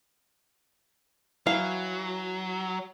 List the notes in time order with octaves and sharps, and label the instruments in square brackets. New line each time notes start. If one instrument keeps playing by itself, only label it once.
[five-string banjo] E3 F5 [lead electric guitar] F#3